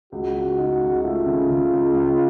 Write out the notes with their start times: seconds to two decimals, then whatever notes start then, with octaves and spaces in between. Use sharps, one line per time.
0.12 C#2 F#4
0.35 C#2
0.58 D#4
0.82 C#2
1.03 A3 F4
1.26 C#3
1.50 C#3
1.73 C#2
1.96 C#2